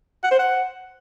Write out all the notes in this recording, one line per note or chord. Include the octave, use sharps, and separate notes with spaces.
F#5
C5
F#5